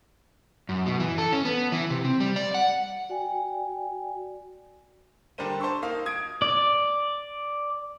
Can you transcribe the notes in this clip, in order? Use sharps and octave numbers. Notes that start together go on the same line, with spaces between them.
F#2
B2
E3
A4
C#4
B3
E3
C3
C4
G3
D5
F#5
F#4 D5 G5 G#5
D3 G3 D4 A#4 C5 D#7
C5 A5 C6 C#6 E6
A#3 D#4 D#5 F5
D#6 G#6 D7
D5